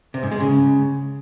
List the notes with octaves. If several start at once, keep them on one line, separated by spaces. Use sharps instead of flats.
C3
G#2
G#3
C#3